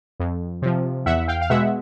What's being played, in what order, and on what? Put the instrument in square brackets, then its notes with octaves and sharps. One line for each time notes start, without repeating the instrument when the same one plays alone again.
[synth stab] F2
C3 F3
E2 E5 F#5
F5 G5
F5
B2 G#3 E5 F#5